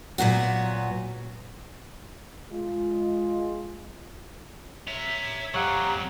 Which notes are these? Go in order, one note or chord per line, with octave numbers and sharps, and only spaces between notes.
A#2 F#3 B3 F#4
G#3 F4
C#5 E5 A#5
F2 F#3 G4 C#5 F5 F#5 A#5